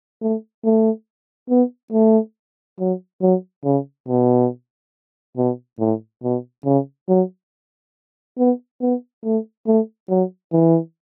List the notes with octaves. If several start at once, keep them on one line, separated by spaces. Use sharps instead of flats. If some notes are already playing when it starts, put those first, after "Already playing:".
A3
A3
B3
A3
F#3
F#3
C#3
B2
B2
A2
B2
C#3
F#3
B3
B3
A3
A3
F#3
E3